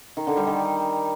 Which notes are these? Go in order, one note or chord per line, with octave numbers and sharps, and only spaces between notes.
D#3
D3
G3
D#3